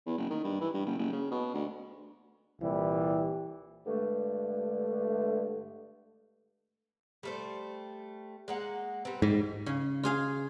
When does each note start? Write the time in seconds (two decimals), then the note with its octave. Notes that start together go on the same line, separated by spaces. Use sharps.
0.06 E2
0.18 F#1
0.30 D#3
0.44 G2
0.61 E3
0.74 G2
0.86 F#1
0.99 F#1
1.12 C#3
1.31 B2
1.54 D2
2.62 C2 A#2 E3 G3
3.86 G2 D3 G#3 A3
7.23 G3 A3 C5
8.48 G#3 A#3 F#5
9.05 G3 B3 C4
9.22 G#2 G3
9.66 C#3
10.03 F4 G#4 F5